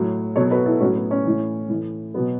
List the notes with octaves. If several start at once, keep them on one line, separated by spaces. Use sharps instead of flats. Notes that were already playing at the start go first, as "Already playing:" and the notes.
Already playing: A2 F#3
B2 F#3 A4 C#5
A4
F#4 B4
E4 A4
A2 F#3 C#4 F#4
B3
C#4
A2 E3
A2 E3
B2 F#3 B3